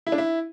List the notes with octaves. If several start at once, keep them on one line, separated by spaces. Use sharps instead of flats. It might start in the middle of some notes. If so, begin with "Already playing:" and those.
E4
D4
E4